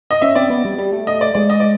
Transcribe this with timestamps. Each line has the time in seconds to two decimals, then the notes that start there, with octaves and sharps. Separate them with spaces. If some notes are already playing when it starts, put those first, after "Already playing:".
0.11 D#5
0.22 C#4 E5
0.35 C4 D5
0.50 B3
0.65 G3
0.78 G3
0.92 A3
1.07 D#5
1.21 D5
1.35 G#3 D5
1.50 D#5
1.60 D5